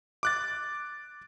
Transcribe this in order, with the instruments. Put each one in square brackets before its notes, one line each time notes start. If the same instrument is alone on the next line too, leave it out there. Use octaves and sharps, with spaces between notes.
[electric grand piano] D6 F#6 A6